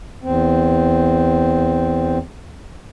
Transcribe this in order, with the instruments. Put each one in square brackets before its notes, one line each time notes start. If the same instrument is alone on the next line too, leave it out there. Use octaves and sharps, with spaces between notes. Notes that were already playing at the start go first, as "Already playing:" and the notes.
[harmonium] E2 C4